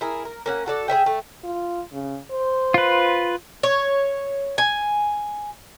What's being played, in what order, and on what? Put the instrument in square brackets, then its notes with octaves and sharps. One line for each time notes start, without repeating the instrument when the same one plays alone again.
[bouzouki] E4 G#4 A#4
A#4
A#3 C#4 F#5
F#4 A4 D5
G#4 C5 E5 G5
A3
[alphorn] F4
C#3
C5
[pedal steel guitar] F4 B4
[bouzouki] C#5
G#5